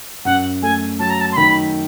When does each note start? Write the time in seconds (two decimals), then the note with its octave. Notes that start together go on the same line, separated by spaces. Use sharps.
0.25 F#2 F#5
0.62 A3 G#5
0.99 F#3 A5
1.10 A#5
1.21 A5
1.32 C6
1.37 D#3 B5